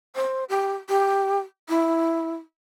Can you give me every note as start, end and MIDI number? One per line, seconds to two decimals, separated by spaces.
0.16 0.44 72
0.49 0.73 67
0.89 1.39 67
1.69 2.31 64